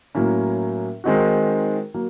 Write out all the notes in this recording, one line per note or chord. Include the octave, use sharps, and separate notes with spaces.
A2 F#3 A#3 C#4
D#3 G#3 C4 D#4 F#4
F#3 A#3